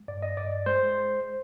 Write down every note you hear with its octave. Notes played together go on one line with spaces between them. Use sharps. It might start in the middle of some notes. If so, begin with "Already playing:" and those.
Already playing: G#3
G2 D5
D#5
G2 D5
G#3 C5